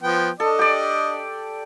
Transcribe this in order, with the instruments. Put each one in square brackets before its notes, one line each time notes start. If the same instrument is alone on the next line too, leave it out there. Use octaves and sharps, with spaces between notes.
[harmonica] F3 B3 G5
[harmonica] D4 D#5 [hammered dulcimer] A4
[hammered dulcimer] G4 D5